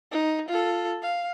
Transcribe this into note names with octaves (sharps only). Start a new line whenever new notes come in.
D#4
F4 A4
F5